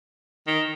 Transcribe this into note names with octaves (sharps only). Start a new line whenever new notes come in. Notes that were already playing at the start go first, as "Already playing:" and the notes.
D#3